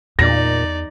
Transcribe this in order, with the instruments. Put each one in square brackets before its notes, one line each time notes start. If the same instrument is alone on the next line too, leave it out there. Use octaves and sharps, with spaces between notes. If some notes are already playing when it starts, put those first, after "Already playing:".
[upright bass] E2 [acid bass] A#2 [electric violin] D#4 D5 [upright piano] A#6